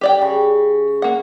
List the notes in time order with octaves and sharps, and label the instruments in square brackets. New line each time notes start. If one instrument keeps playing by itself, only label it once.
[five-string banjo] G4 D5 G5
[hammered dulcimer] C#3
[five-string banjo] A#3 F#5